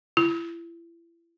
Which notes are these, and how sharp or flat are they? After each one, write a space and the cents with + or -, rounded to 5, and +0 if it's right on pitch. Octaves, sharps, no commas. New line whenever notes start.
E4 +35